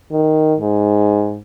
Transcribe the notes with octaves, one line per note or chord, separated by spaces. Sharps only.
D#3
G#2